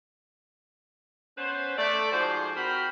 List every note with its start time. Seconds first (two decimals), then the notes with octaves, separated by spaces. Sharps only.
1.37 B3 C#4 B4 C5
1.77 A3 D5
2.12 G#2 F3 F#4 C5
2.55 C4 F#4 A#4 C5 G5 B5